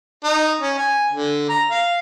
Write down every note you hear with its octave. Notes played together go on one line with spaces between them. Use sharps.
D#4
C#4
G#5
D3
A#5
F5